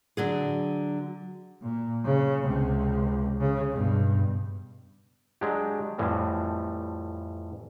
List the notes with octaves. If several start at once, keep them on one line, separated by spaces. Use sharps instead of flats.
D3 F#3 G#4
A#2
C#3
C#2 C3
C#3
G2 B2
F#3 G#3 D4 G4
F2 A2 E3 G3